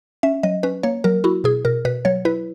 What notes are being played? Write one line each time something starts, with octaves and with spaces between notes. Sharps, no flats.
C#4 E5
F#3 D#5
C#4 B4
A#3 C#5
F#3 A#4
E4 F#4
B2 G#4
B2 A#4
B2 B4
F#3 C#5
E4 B4